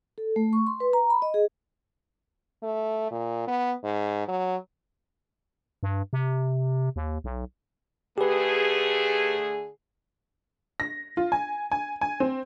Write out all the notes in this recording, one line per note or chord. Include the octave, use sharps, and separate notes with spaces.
A4
A3
C#6
C6
B4
A#5
B5
D#5
G#4
A3
A#2
B3
G#2
F#3
G2
C3
D#2
B1
D3 A3 G4 G#4 B4
A#6
F4
G#5
G#5
G#5
C4